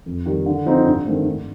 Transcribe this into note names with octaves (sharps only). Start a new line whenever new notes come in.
F2
D#3 G3
D3
F3 C4 D#4
G2
D#3 A3 C4
G2